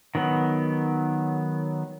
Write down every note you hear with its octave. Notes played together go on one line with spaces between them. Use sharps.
D#3 F#3 B3